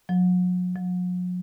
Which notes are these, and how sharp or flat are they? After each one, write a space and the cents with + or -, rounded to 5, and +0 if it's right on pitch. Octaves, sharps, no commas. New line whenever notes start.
F#3 -40
F#3 -45